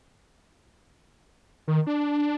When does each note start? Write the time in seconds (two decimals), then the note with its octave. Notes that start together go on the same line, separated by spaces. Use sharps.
1.68 D#3
1.86 D4